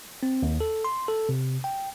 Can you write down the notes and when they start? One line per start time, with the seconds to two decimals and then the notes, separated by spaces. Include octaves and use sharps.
0.23 C4
0.42 D#2
0.60 A4
0.84 C6
1.08 A4
1.29 C3
1.64 G5